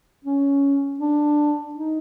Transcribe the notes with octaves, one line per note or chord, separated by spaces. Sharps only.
C#4
D4
D#4